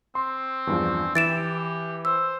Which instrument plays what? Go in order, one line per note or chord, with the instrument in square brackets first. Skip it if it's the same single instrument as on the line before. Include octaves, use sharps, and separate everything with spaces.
[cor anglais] C4 [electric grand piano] C6
[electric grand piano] E2 G2 F3
[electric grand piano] E3 [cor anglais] E5 [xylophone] A6 D7 E7
[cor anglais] G4
[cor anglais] C5 [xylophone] E6